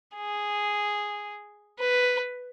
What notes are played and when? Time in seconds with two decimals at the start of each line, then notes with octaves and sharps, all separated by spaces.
0.16 G#4
1.80 B4